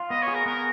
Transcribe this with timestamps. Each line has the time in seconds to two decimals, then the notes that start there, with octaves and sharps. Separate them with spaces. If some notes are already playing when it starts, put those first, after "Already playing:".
Already playing: F4
0.10 B3 D#5
0.22 C#5
0.28 G#4
0.34 A#4
0.46 B3 A#4